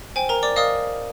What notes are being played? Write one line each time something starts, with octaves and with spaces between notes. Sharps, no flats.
C5 G5 G#5
A#4 A#5
D5 D6
A#4 D5 D#5 F5 D#6